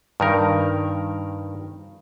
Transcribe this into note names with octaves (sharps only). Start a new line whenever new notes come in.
G2 D#3 A#4